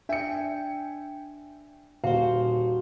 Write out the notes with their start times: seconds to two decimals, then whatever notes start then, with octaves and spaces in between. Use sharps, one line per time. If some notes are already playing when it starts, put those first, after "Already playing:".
0.09 D4 E5 G5 G#5 C#7
2.04 D#1 F#4 C5 F5